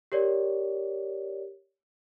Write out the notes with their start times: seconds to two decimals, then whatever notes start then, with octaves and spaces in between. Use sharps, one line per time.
0.12 G4 A#4 C#5 D5